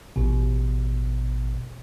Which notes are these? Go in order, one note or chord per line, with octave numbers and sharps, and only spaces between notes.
A1 B2